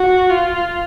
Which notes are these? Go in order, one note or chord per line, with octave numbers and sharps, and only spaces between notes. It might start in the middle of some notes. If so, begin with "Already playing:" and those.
Already playing: F#4
F4